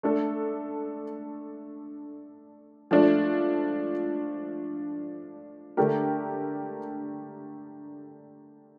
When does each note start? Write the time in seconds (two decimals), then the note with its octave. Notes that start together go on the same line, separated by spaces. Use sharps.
0.03 A3 D4 A4
2.91 F3 A3 D4
5.77 D3 A3 D4 G4 A#4